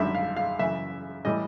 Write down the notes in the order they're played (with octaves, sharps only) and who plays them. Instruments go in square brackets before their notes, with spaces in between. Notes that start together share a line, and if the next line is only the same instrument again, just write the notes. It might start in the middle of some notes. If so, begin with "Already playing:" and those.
Already playing: [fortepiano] G#1 F#2 D3 G3 E5
F5
F5
F#2 C#3 E3 E5
A2 E3 G3 D#5